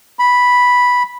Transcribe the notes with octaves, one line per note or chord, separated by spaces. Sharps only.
B5